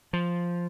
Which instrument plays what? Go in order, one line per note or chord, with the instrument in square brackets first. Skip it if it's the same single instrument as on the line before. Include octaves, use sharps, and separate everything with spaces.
[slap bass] F3